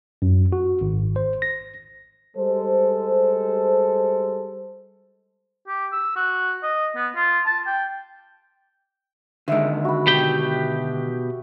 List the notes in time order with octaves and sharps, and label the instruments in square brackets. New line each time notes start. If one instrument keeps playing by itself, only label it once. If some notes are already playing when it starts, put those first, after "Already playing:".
[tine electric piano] F#2
F#4
G#1
C5
A#6
[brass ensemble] G3 G#3 A4 C5
[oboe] G4
E6
F#4
D#5
B3
F4
A5
G5
[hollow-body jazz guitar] D3 D#3 G#3 [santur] E5
[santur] F#4 B5
[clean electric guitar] B2 G4 G5